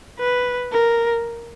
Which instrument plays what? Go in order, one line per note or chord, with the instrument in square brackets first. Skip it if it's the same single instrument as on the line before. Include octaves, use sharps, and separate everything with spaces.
[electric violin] B4
A#4